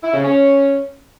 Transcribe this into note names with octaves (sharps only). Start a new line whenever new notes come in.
E4
C#3
C#4